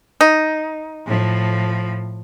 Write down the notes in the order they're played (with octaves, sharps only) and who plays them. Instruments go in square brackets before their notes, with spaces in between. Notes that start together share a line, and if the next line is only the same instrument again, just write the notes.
[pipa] D#4
[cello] A2 F3